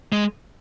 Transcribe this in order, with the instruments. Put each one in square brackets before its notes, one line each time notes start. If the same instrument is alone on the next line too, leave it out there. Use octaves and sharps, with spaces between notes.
[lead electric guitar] G#3